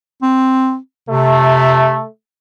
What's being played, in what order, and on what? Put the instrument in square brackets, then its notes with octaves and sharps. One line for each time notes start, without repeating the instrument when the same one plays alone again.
[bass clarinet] C4
[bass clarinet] C3 [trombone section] A3